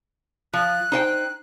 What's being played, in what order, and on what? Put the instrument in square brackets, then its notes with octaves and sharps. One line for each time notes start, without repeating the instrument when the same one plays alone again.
[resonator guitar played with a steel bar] F3 [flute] F#6
[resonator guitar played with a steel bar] D#4 C5 G5